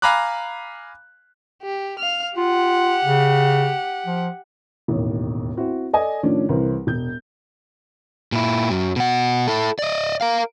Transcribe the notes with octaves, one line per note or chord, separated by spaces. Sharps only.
F5 G#5 A#5 B5 D6 F#6
G4
F5 F6
F4 G4 F#5
C#3
F3
E1 A1 D#2
C4 E4 F#4
A4 D5 D#5 G#5
A2 D#3 F3 C#4 D4
C2 E3 E4 A#4 C5
E1 G6
A#2 E4
F#2 F#3
B2 F#5
E4 A4
D5 D#5
A#4 F5